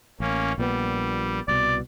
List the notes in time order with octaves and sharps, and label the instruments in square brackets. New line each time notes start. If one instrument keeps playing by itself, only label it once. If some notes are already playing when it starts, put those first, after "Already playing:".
[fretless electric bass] A1 [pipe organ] A#3 C#4
[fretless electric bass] A#1 A#2 B3 [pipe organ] G3
[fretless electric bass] C2 B2 [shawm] D5